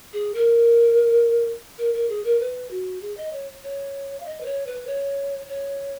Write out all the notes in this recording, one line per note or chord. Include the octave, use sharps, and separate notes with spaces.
G#4
A#4
A#4
A#4
G#4
A#4
B4
F#4
G#4
D#5
C#5
C#5
F5
D#5
B4
C#5
B4
C#5
C#5